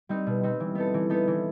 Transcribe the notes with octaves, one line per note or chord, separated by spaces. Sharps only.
G3 C4 D#4
B2
G3 C4 D#4
E3
B3 D#4 A4
E3
B3 D#4 A4
E3